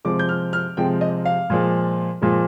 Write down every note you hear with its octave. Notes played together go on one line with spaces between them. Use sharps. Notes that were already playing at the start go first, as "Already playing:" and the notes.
C3 F3 G#3 D6
G6
F6
F6
C3 F3 G#3 G5
D#5
F5
A#2 F3 G#3
A#2 F3 G#3